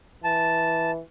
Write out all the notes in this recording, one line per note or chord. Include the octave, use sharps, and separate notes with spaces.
E3 A5